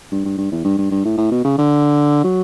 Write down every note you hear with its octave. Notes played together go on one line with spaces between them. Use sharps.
G2
G2
G2
E2
G2
G2
G2
A2
A2
B2
C#3
D3
F#3